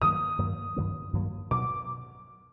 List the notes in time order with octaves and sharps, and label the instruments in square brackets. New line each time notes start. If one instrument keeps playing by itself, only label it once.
[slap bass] G2 D#3 F#3 A#3 [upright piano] D#6
[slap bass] G2 D#3 F#3 A#3
G2 D#3 F#3 A#3
G2 D#3 F#3 A#3
[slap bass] B2 F#3 B3 [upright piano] D6